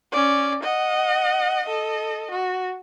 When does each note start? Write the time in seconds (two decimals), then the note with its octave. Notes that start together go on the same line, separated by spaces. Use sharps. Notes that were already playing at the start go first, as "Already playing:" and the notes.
0.12 C#4 D5
0.63 D#5 F#5
1.66 A4 D#5
2.32 F#4